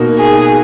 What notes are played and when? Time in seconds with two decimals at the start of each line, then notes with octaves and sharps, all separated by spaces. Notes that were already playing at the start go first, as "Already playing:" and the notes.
Already playing: B2 A#3 D#4 F#4 A#4
0.19 G#4